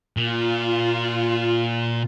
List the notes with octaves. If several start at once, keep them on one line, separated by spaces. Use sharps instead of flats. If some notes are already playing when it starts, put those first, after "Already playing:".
A#2 F4